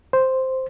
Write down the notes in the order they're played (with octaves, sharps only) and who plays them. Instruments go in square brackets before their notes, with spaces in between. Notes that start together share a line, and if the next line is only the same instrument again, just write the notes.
[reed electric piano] C5